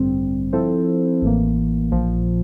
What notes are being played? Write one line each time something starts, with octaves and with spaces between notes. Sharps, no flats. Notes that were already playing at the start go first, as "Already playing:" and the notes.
Already playing: A1 G2 D3 G3 C4
F3 C4 E4 A4 C5
A1 A2 E3 A#3
A#1 A#2 F3